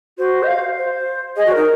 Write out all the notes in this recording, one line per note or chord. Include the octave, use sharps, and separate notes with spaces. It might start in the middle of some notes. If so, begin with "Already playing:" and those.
F#4 C5
D#5
F5
C5
G#4 D#5
F#4
D#4 A#4